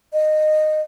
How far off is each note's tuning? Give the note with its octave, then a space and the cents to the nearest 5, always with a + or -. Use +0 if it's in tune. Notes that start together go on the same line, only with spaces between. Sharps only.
D#5 -15